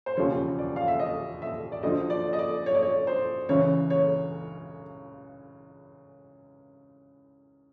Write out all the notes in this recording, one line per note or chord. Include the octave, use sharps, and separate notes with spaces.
C5
E1 D#2 C#3 F3 C#5
D5
F5
E5
D#5
E5
D5
D2 D3 F3 D#5
D5
D#5
D5
C#5
D5
C#5
C5
C#2 C#3 E3 C#5
C#5